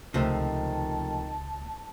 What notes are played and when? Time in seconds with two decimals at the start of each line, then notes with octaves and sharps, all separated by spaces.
0.14 C#2 C3 D#3 F3 A3 A5